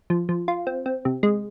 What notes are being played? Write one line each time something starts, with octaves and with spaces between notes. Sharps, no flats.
F3
F3
F4
C4
C4
C3
G#3